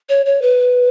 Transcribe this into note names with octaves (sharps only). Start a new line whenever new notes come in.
C#5
C#5
B4